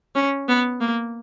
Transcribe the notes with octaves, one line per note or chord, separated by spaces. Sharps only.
C#4
B3
A#3